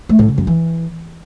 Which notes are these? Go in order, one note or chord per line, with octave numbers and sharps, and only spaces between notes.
A3
A2
C#3
F#2
E3